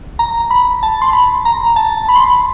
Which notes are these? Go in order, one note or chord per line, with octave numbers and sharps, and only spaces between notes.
A#5
B5
A5
C6
B5
A#5
A5
B5
C6
B5